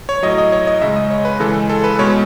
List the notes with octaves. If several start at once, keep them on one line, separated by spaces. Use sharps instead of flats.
C#5
A2 F#3 D#5
D#5
C#5
D#5
C#3 G#3 E5
D#5
C#5
B4
C#3 E3 G#3 A4
A4
B4
B2 G#3 C#5